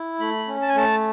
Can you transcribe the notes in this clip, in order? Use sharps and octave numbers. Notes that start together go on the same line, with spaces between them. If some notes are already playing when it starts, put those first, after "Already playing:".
Already playing: E4
A3 B5
C#4
A5
G#5
A3 A5